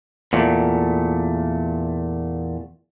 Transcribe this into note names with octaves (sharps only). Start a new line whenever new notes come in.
E2 A#2 A3